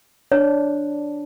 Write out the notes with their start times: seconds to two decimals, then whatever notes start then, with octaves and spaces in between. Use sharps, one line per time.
0.32 D4 C#5